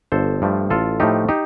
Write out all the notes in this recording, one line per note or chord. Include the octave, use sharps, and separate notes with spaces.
G1 A4 C5
G2 F3 A3
A1 F4 A4
A2 F3 A3 D#4 G4
D#4 G4